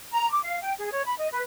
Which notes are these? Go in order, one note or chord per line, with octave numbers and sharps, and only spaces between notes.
A#5
D6
F5
G5
G#4
C#5
B5
D#5
B4